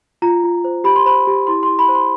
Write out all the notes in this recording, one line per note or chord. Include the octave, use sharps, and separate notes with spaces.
F4 A#5
F4
C5
G4 B5
C6
C5 B5
G4
E4 C6
C6
E4
B5
C5
C6